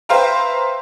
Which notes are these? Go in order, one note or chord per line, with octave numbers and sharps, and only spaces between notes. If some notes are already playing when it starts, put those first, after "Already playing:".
B4 C5 E5 F5 G5 A#5